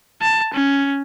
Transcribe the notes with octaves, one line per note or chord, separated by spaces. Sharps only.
A5
C#4